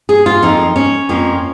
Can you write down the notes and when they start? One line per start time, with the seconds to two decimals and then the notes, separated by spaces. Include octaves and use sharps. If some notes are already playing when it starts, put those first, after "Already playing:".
0.09 G#4
0.26 F4
0.42 F2 F3 A#3 D#4
0.76 C#4
1.09 F2 F3 A#3